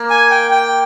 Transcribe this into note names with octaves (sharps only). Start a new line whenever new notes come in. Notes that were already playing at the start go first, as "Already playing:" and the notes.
Already playing: A#3
G#5
G5
G5